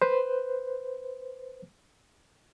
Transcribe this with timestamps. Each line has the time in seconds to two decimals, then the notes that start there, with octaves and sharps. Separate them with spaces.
0.02 B4 C5